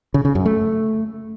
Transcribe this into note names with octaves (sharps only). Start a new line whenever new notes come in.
C#3
C#3
F#2
A3